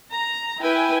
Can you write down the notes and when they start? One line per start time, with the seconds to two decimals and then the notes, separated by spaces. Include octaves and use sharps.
0.11 A#5
0.62 E4 B4 G5 G#5